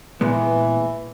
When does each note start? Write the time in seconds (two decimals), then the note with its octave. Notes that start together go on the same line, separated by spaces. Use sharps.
0.21 A#2 E3 G#3 B3